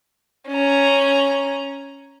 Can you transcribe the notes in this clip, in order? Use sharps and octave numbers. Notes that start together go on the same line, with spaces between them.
C#4 A#5